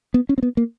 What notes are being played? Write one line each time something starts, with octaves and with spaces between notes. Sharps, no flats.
B3
C#4
C4
B3
A#3